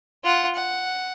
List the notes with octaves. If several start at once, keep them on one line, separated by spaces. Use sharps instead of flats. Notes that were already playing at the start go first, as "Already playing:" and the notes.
F4 F#5
F#5